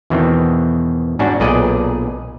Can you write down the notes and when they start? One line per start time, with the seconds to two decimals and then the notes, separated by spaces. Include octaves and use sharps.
0.10 E2 B2 D#3 E3 C4
1.19 G#2 C#4 D4 F#4
1.40 B1 A#2 G#4 B4 D5 D#5